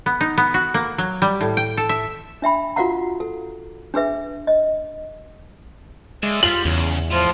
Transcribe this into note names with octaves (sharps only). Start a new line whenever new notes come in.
B3
D#4
B3
F#4
A#3
F#3
G3
A2
G5
A4
E5
D4 E5 G5 B5
F4 F#4 A#4 F5 F#5 A#5
A4
D4 G#4 B4 E5
D#5
G#3 D5 E5
G3 F4 F#7
E2 C#3
A2 F3 F4